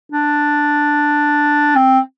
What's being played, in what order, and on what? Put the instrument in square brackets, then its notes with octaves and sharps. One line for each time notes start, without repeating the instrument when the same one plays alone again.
[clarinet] D4
C4